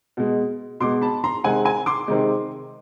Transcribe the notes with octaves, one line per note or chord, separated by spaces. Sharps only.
B2 G#3
B2 G#3 C6 D6
A5 B5
A#5 C6
C3 D#3 G#3 F#5 G#5
G#5 A#5
C6 D6
C3 D#3 G#3